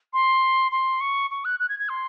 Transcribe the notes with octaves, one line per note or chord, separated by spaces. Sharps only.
C6
C6
C#6
C#6
F#6
F#6
G#6
G#6
C6